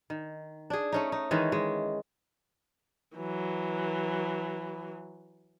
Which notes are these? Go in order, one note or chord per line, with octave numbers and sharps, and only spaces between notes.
D#3
D4 G#4
A3 C#4 D#4
D#4
D#3 E3 G#3 C#4
G#3
E3 F#3